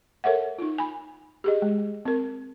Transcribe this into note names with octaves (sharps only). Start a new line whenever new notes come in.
A4 A#4 C#5 E5 F#5
D#4 F4
G#5 B5
G4 G#4 D#5
G#3
C4 A#4